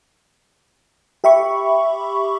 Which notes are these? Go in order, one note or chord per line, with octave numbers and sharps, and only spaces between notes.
G4 E5 B5 C#6